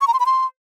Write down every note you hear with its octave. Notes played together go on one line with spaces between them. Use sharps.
C#6
A#5
C6
B5
C6